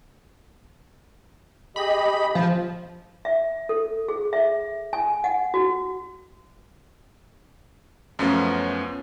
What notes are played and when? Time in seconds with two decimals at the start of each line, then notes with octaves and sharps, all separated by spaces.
1.76 G4 G#4 D#5 B5
2.35 F3
3.25 E5
3.69 A4
4.08 G#4
4.33 E5
4.93 G#5
5.24 F#5
5.54 F#4
8.19 F#2 F3 A3 B3 C#4 F4